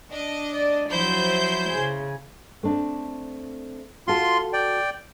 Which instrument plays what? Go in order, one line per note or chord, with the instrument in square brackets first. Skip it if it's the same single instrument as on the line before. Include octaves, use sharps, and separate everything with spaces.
[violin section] D4 D#5
[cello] D5
[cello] F3 F#3 [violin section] E4 C5 G6
[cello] C#3 G#4
[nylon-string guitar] A3 C4 D4
[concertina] F4 C6 [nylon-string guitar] F#4 A4
[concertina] D5 G5